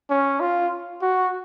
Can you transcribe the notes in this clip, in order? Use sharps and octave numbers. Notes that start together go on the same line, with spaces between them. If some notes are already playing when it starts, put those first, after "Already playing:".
C#4
F4
F#4